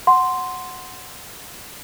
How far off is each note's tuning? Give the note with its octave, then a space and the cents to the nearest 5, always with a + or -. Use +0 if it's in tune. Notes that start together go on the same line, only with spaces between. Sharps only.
F#5 -5 C6 +0